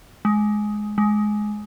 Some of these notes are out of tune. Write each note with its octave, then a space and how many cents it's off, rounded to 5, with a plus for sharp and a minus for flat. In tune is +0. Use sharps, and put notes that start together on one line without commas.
G#3 +15
G#3 +15